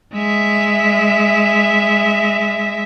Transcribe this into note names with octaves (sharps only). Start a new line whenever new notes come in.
G#3 E5